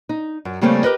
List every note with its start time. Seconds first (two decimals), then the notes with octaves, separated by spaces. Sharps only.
0.09 D#4
0.45 F#2
0.61 C#3 G3 A3 A#3 C4 C#4
0.83 G4 A#4 B4 D#5